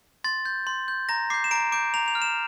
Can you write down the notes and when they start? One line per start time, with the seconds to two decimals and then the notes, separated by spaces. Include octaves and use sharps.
0.24 C6 A6
0.45 G6
0.67 C6
0.88 G6
1.09 A#5 A#6
1.30 D6 G6 C7
1.44 E7
1.51 A#5 D7
1.72 D6 G6 D7
1.94 A#5 F7
2.08 F7
2.15 F6
2.22 E7